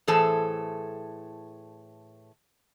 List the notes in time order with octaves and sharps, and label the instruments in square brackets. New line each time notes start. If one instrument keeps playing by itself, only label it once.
[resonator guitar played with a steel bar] A2 E3 G#4 A4 C5 A5